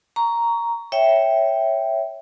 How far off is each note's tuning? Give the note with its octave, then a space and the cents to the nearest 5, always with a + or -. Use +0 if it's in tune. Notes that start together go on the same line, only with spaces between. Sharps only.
A#5 +0 C#6 +20
C#5 +0 E5 +0 G5 +0